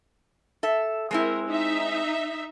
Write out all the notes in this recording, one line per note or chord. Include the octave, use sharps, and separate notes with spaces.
A4 E5
G#3 C4 E4 A#4
D#4 E5